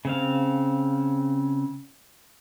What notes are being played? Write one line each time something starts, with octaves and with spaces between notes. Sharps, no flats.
C#3 C4 F5